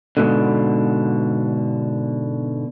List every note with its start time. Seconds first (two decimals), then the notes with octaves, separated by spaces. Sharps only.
0.17 G#2 B2 D3